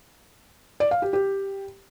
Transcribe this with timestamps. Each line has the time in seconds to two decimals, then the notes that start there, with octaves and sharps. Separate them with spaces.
0.80 D5
0.91 F5
1.02 G4
1.13 G4